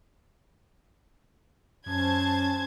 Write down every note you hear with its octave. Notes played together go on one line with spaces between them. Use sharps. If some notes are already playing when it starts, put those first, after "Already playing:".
F#2 C#4 C5 A5 G#6